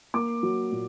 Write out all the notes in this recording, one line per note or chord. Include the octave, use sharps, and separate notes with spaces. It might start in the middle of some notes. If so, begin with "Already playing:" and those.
A#3 D6
F#3
A#2